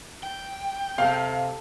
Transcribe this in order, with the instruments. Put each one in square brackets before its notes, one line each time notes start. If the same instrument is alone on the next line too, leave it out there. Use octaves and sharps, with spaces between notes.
[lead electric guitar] G5
[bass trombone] C3 [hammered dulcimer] A4 A#5 [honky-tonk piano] F5